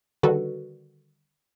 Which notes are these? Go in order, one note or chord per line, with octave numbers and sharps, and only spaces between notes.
D3 D#3 G3 F#4 A4 B4